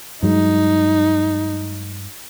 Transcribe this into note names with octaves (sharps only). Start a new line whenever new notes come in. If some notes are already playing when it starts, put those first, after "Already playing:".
G2 F#3 G#3 D#4